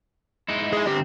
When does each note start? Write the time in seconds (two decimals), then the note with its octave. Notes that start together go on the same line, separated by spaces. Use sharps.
0.48 G#3 D#4 E4
0.73 G#4 D#5
0.87 D3 C4 G4